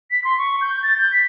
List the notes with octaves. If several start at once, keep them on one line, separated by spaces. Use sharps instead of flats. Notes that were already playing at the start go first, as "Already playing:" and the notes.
B6
C6
C#6
G6
A6
G6
B6